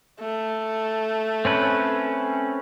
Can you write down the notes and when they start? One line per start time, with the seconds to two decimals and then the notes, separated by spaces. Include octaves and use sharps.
0.20 A3
1.45 C4 C#4 B4